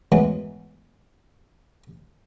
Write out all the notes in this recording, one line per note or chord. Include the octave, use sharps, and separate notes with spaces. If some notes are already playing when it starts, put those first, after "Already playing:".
G#2 E3 F#3 G#3 B3